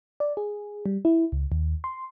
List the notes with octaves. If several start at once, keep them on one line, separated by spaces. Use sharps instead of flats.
D5
G#4
G3
E4
C#2
D#2
C6